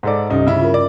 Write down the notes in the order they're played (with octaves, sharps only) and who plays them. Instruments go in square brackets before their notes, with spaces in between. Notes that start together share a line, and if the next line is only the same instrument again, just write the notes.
[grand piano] G#2 A4 D5
[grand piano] C2 D#4 [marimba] G2 G3 C#4
[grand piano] C#3 E4
[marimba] F4 A#4
[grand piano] D5